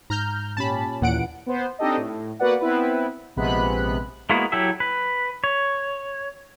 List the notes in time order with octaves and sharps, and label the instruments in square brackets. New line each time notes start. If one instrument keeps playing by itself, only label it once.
[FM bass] G#2 [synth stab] A#5 F6 G6
[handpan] A#2 C#4 G4 [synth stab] A5 B5
[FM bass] D#2 [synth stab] A#2 F#5 D7 [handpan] E3
[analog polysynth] B3 C5
C4 D4 D#4 G4 A4 D#5
A2
A#3 B3 F#4 B4 D5 F#5
B3 C4 E4 B4
A#1 C3 G#3 B3 B5 F#6
[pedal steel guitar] G#3 A#3 B3 E4 F#4
F#3 E4 G4 A4 E5
B4
C#5